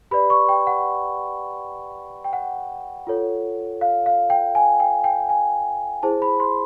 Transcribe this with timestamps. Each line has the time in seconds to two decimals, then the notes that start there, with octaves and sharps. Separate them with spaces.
0.11 G4 B4 D5 B5
0.30 C#6
0.49 G5
0.67 F#5
2.24 G5
2.33 F#5
3.07 F4 A4 C#5
3.81 F5
4.06 F5
4.30 G5
4.55 G#5
4.80 G5
5.04 G5
5.29 G#5
6.03 E4 G#4 C5 A5
6.22 B5
6.40 C6